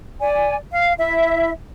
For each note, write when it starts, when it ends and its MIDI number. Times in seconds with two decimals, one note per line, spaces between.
0.20 0.56 74
0.20 0.56 80
0.71 0.93 77
0.98 1.50 64
0.98 1.50 76